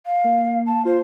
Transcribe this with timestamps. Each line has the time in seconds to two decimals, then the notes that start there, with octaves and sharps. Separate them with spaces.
0.06 F5
0.24 A#3
0.66 A5
0.85 F4 C5